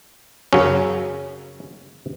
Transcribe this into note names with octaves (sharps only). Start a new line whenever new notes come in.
F#2 C#3 F#3 C#4